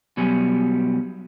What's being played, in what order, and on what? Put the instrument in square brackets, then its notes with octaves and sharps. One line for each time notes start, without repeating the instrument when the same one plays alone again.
[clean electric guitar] B2 F#3 G3 C#4